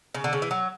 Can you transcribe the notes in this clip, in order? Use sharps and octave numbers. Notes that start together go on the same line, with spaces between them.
C#3
D3
C#3
E3
F#3